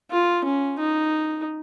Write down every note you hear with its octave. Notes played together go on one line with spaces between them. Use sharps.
F4
C#4
D#4